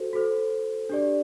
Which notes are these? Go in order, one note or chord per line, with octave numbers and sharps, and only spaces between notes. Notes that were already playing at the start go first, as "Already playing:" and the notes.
Already playing: F#4 A4 C5
F#4 A4 C5
D4 G4 D5